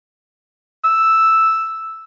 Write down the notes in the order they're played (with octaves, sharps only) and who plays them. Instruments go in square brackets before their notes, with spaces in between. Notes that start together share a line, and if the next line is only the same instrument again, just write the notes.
[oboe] E6